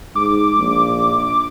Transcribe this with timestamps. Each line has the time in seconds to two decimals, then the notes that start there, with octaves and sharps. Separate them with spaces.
0.16 G#2 D6
0.57 A#1